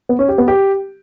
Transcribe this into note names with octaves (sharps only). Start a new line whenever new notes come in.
B3
C#4
G4
B3
G4